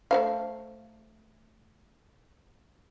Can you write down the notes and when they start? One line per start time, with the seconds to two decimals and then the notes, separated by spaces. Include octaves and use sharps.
0.11 A3 C5 F5